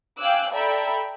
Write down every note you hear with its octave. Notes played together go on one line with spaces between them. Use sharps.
F5 G5 G#5 D6 E6 F#6
A4 D5 E5 G5 A#5 B5